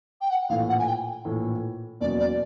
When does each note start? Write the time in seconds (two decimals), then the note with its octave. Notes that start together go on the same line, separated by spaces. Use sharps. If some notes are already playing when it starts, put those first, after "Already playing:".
0.21 G5
0.30 F#5
0.49 A#1 A2 E3 A3 F5
0.69 F#5
0.79 G#5
0.88 G5
1.25 A#1 A2 E3 A3
2.00 E2 B2 F#3 A#3 C#4 D5
2.19 D5